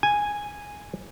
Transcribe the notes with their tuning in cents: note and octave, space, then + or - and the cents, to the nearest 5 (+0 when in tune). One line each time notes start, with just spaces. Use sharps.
G#5 -5